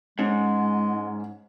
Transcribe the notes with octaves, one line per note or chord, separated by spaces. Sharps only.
G#2 G#3 C#4